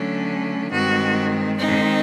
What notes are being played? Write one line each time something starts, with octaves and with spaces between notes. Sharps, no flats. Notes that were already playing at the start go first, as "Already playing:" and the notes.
Already playing: D3 F#3 A3 C#4
G2 D#3 G#3 C4 F#4
D#3 G#3 C4 D#4